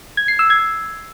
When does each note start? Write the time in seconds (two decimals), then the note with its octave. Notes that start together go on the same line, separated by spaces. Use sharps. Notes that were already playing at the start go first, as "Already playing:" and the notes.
0.17 G#6
0.28 C7
0.39 E6
0.50 G#6